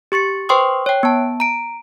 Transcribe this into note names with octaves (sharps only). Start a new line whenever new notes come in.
G4 C#6 A6 C#7
B4 C5 G5 C6 C#6 D#6
C#5 G5
B3 A5
A#5 D7